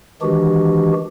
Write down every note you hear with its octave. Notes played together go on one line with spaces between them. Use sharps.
D#3 E3 G#3 D4 F#4 G4